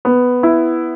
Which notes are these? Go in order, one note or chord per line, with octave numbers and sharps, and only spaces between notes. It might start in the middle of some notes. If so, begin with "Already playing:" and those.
B3
E4